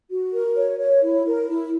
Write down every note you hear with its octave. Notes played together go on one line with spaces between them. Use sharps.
F#4
A#4
C#5
C#5
E4
A#4
E4